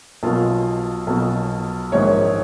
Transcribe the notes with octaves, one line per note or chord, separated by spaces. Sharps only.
B1 B2 F4
B1 B2
A#1 G#2 D#3 C#5